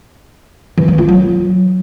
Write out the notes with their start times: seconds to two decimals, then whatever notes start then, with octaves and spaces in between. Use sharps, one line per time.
0.78 E3
0.88 A#3
0.98 F4
1.09 F#3